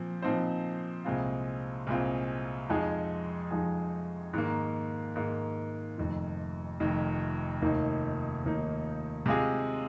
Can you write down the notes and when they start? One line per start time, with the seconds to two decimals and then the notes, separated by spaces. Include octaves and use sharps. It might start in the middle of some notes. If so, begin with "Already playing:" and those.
Already playing: A#2 F3 C4
0.22 A#2 F3 C4 D#4 C5
1.05 C2 A#2 G#3 C4 F4
1.87 C2 A#2 G#3 C4 F4
2.69 F2 F3 G#3 D#4 G#4
3.51 F2 F3 G#3 D#4 G#4
4.33 G#2 D#3 A#3
5.16 G#2 D#3 A#3
5.98 F1 F2 D#3
6.80 F1 F2 D#3
7.62 F1 D#2 D#3 A#3 D#4
8.45 F1 D#2 D#3 A#3 D#4
9.26 C3 G#3 F4 G#4